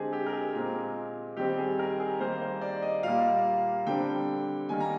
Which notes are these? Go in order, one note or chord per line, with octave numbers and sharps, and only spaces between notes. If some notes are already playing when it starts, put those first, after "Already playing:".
Already playing: D3 G#3 C4 G4 G#4
G4
A#4
G#4
A#2 G#3 C4
D#3 G3 C4 G4
G#4
A#4
G#4
D#3 G3 A#3 C5
C5
D5
D#5
A#2 G3 A#3 F5
D3 G3 C4 G5
D#3 G3 A#3 G#5
A#5